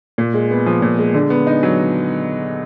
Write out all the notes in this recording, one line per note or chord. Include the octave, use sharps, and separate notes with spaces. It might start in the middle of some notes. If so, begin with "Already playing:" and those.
A#2
G#3
B3
F3
A#2
G#3
D3
B3
D#4
F#3